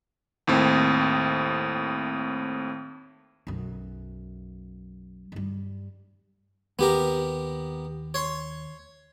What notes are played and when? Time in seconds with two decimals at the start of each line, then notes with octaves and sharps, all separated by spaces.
0.47 D#2 A2 C4
3.47 B1 F#2
5.32 G2 G3
6.79 D#2 B3 G4 A#4
8.14 C#5 C6